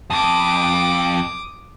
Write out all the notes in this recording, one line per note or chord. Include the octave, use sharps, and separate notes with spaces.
F2 D6 D#6